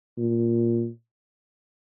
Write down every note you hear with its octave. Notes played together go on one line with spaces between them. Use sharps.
A#2